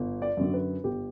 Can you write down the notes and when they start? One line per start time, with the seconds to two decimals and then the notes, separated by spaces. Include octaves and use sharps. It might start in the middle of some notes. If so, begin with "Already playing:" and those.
Already playing: G1
0.22 D5
0.37 F#2 D3 F#3
0.54 B4
0.84 G1 G4